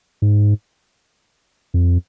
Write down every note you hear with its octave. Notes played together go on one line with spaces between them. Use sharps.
G#2
F2